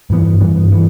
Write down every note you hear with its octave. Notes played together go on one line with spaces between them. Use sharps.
G2 E3 B3
G2 E3 B3
E3 B3